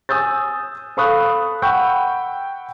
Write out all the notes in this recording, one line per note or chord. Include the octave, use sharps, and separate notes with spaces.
G#5 D#6 E6 G6 A6
A4 F5 B5 C#6 D#6 F#6
F#5 G5 B5 C#6 E6 G6